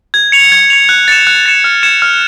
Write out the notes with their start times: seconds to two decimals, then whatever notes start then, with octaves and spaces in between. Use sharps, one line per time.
0.14 G#6
0.32 C#7 F7
0.52 G#6
0.70 C#7 F7
0.89 F#6
1.08 A6 C#7 E7
1.27 F#6
1.46 A6 C#7 E7
1.64 F6
1.83 G#6 C#7 E7
2.02 F6